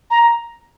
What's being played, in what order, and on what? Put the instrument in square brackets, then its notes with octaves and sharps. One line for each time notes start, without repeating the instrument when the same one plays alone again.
[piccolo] A#5